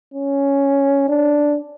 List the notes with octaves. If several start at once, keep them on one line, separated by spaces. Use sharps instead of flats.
C#4
D4